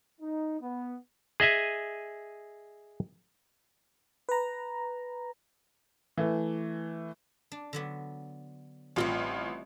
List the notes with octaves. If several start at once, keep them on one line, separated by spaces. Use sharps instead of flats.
D#4
B3
G#4 D#5 E5 G#5
B4 A#5
E3 A3
D4
D3 F#3 B3
A1 G3 C4 E4 F4